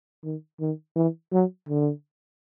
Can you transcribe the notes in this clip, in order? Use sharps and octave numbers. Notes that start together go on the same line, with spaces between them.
D#3
D#3
E3
F#3
D3